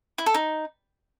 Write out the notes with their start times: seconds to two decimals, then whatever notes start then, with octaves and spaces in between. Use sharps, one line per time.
0.18 E4
0.26 A4
0.34 D#4